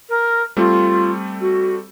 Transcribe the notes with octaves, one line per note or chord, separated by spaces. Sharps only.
A#4
G3 A3 C4 F4
F#4